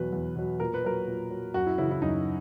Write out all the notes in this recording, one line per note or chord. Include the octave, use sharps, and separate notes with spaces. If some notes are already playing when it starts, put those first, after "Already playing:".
Already playing: E2 B2 F#3 B4
E2
B2 F#3
A#2 A#4
B4
F#3 A#4
A#2
F#3
F#2 F#4
E4
C#3 E3 E4
E4
F#2 D#4